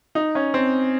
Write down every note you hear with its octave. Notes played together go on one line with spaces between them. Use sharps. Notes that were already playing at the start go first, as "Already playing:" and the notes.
D#4
C#4
C4